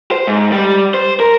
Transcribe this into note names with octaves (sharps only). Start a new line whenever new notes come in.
C5
G#2
G3
C5
A#4